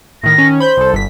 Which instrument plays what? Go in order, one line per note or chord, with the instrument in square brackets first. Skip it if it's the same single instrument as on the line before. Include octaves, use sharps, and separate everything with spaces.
[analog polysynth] A2 D#3 [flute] A#6
[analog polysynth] D#3 C#4
[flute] C5 [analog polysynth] B5 G6
[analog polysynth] C2 A4
G1 B6